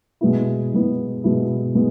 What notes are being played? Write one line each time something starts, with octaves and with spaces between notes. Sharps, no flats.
B2 G#3 B3 E4
B2 G#3 B3 E4
B2 G#3 B3 E4
G#3 B3